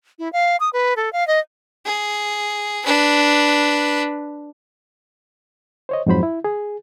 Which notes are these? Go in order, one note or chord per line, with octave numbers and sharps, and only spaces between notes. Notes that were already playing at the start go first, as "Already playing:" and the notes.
E4
F5
D#6
B4
A4
F5
D#5
G#4
D4 B4
C5 C#5 D#5
F2 G#2 F#3 C5 B5
E4
G#4